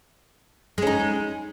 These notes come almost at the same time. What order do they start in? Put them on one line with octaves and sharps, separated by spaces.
G#3 C#4 D#4